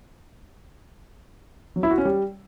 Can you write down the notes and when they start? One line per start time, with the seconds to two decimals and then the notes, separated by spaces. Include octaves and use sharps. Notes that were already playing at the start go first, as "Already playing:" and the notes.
1.76 F#3
1.83 E4
1.91 F#4
1.98 C#4
2.05 G3